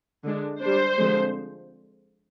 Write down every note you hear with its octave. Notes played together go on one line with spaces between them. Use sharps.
D3 G#3 D4
G3 D4 C5
D3 F3 G#3 C4